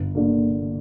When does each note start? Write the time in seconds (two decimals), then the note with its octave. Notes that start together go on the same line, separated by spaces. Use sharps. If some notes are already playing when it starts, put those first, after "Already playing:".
Already playing: G1
0.15 D3 A#3